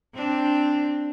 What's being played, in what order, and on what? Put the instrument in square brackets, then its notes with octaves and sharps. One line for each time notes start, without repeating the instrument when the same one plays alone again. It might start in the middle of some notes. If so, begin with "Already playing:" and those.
[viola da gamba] C4 D4